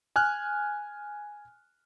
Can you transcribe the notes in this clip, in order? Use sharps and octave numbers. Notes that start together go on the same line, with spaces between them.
G#5 F6 F#6